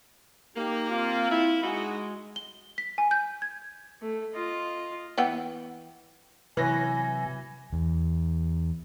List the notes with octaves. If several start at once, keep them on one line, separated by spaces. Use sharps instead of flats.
A#3 D#4 G4
C4 F4
E4
G#3 D#4 F#4
G7
B6
G#5
G6
G#6
A3
F4 D#5
E3 B3 G5
C3 E3 F#3 B4 C#5 G#5 A#6
E2